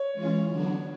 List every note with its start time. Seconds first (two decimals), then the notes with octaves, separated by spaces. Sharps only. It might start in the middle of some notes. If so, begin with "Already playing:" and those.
Already playing: C#5
0.13 E3 G#3 C#4 F4
0.49 D3 F#3 B3 D4